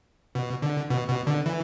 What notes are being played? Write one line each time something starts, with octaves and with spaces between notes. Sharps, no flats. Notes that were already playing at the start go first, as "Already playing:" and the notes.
B2
D3
B2
B2
D3
E3